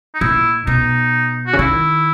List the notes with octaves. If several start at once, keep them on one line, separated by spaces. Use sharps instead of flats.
D#4
A#2 E4
B2 D#4
F#4
C#3
D#3 E4